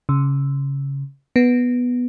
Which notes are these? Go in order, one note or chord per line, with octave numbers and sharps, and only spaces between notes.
C#3
B3